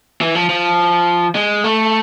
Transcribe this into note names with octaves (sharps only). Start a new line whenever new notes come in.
E3
F3
F3
G#3
A3